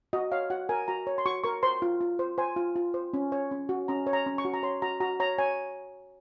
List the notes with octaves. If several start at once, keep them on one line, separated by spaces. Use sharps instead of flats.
F#4 D#5
C#5 F5
F#4 F#5
A#4 G#5
F#4 A#5
C#5
C6
F#4 C#6
A#4 C#6
C5 C6
F4
F4
C5
C5 G#5
F4
F4
C5
C#4
C#5
C#4
F#4
C#4 A#5
C#5
A#5
C#4
C#6
F#4
A#5
C#5 C6
F#4 A#5
F#4 A#5
C#5 A#5
C#5 G#5